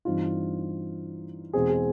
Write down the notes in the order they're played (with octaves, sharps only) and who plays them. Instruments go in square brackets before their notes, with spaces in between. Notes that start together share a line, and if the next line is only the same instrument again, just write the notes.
[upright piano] G2 E3 G3 C4 D#4 F4
E2 B2 G#3 C4 G#4
G#4